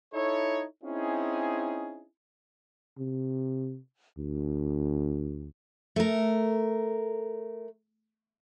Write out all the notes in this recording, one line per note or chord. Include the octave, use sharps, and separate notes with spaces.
D#4 E4 A4 C#5
C4 C#4 D#4 E4 G#4
C3
D2
A3 A#4